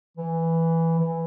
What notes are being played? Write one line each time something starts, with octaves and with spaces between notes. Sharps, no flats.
E3
E3